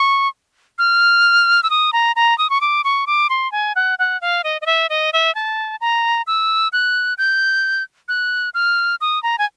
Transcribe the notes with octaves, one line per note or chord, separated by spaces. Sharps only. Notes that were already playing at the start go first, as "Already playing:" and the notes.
Already playing: C#6
F6
E6
D#6
A#5
A#5
D#6
C#6
D6
C#6
D6
C6
G#5
F#5
F#5
F5
D#5
D#5
E5
D#5
E5
A5
A#5
E6
F#6
G6
F#6
F6
D#6
A#5
G#5